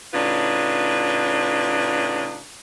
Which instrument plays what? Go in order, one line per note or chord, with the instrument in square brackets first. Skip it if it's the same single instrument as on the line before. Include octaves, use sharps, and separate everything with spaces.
[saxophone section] A2 C#3 D4 D#4 F4 B4